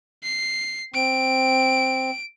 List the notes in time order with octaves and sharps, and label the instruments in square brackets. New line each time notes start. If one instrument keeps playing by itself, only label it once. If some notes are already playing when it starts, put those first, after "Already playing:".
[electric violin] C7
[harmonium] C4 [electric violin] D7